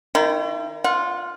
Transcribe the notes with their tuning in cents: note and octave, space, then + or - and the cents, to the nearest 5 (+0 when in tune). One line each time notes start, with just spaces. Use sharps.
D#3 +0 E4 +40
F4 +0 F#5 -35